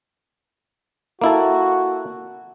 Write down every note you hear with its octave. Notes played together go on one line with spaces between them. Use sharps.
A#3 E4 F#4 A4